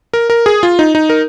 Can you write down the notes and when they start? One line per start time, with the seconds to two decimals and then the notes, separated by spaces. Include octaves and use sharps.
0.14 A#4
0.30 A#4
0.46 G#4
0.63 F4
0.79 D#4
0.95 D#4
1.10 A#4